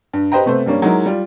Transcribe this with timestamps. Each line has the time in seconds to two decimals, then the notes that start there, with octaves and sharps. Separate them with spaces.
0.13 G2
0.32 G4 B4 C5 D#5 G5 A#5
0.46 C3 A3 B3 C5
0.66 G2 G3 A#3 C#4
0.82 F#3 G#3 D#4 E4 A#4
1.06 G3 F4